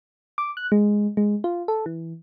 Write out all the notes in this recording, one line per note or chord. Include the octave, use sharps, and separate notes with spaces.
D6
F#6
G#3
G#3
F4
A4
E3